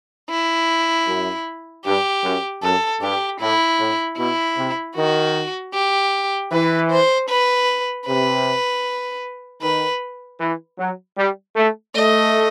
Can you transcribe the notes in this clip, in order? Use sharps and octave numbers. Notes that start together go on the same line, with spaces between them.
E4
F#2
G2 G4
F#2
F#2 A4
G2 G4
A2 E4
A2
B2 E4
C3
D#3 F#4
G4
E3 B4
C5
B4
C3 B4
D#3 B4
E3
F#3
G3
A3
A3 D#5